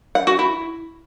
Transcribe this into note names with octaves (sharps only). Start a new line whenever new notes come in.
F#5
F#4
E4